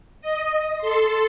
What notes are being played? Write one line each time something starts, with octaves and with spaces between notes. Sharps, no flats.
D#5
A4 C6